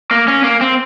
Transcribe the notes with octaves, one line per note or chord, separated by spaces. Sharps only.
A#3
C#4
A#3
C4